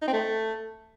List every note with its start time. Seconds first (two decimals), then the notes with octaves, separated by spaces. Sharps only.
0.02 D#4
0.08 C4
0.13 A3